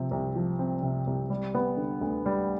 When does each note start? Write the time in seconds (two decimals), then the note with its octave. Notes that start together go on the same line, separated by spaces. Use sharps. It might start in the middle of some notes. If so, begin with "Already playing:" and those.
Already playing: C3 F3 C4
0.11 C2
0.35 F3
0.59 C4
0.82 C3
1.07 C2
1.30 G3
1.55 B3
1.77 D3
2.01 D2
2.26 G3